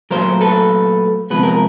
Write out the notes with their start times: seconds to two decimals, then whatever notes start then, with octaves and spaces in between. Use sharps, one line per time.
0.11 A#2 F#3 A3 A#4 C5
0.41 A4 B4
1.30 C3 F3 G#3 B3 B4
1.43 A#4